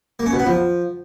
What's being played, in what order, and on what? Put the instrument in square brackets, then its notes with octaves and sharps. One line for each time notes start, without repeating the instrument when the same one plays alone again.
[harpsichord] A#3
C#4
B2
B3
F3